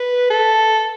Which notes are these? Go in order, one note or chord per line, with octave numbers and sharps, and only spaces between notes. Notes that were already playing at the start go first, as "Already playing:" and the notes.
Already playing: B4
A4